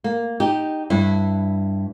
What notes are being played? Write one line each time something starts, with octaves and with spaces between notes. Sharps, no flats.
A#3
D#4 G4
G2 E4